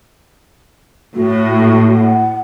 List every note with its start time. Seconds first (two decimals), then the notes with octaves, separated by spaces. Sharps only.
1.16 A2 F#4
1.96 F#5